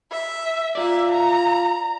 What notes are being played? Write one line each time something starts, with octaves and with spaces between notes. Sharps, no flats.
E5
F4 D5 E5
A#5